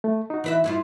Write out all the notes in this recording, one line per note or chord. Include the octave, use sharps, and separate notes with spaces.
A3
D#4 F#4
E3 B4 E5
G2 E4 F4